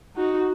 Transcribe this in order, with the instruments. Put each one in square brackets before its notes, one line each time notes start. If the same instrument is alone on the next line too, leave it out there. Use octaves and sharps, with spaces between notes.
[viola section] D#4 F#4